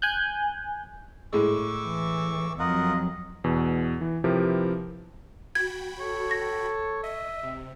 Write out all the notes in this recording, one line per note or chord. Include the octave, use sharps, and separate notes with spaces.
G#5 F#6 G6
A2 G#3 C#6 D6 E6
E3
F2 F#3 F4 A#4 D#5 F#5
E2 B2
E3
C3 F3 E4 G4 A#4 B4
F#4 G5 B5 G#6
A4 C#5
C#6 A#6
D#5 E5
C3